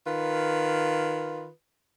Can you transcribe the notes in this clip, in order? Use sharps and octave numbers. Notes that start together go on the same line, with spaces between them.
D#3 F4 B4